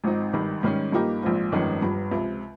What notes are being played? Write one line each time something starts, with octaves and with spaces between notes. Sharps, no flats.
G#1 G#2 F3 C4 D#4
G#1 G2 D#3
G#2 D#3 G3 C#4
G2 F3 A#3 D#4 G4
A#1 G#2 F3 C4 F4
G1 F2 D#3 G#3 C#4
G1 G2 F3
C#2 C3 F3